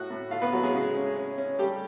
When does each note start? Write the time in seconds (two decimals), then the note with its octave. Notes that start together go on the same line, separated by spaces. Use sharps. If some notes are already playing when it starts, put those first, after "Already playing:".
Already playing: A2 F#4 F#5
0.10 A2
0.31 A3 F4 F5
0.42 B3 B4
0.52 A2 F#3 F#4
0.63 G#3 G#4
0.74 C#3
0.95 C#4
1.16 C#4
1.38 C#4
1.59 G3 A3 G4